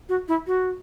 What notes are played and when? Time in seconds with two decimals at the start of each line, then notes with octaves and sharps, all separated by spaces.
0.09 F#4
0.28 E4
0.47 F#4